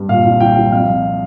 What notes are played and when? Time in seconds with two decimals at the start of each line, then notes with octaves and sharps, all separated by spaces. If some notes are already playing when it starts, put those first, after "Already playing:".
Already playing: G2
0.09 A#2 F5
0.25 C2
0.40 C2 G5
0.57 C2
0.72 F2 F5
0.88 C3